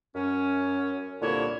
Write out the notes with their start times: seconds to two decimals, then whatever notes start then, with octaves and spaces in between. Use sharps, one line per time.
0.15 F#2 C#4
1.22 C2 A#2 D3 A#3 E4 C#5